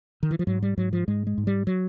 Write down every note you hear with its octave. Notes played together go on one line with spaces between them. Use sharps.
D#3
E3
F3
G#2 F#3
G3
G#2 F#3
F3
G#2 G#3
G#3
G#2
G3
F#3